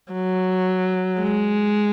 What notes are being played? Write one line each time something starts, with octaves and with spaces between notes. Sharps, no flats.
F#3
G#3